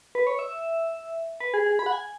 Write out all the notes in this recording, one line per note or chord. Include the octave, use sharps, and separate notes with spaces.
B4
C#5
E5
B4
G#4
G#4
B5
F#5
G#5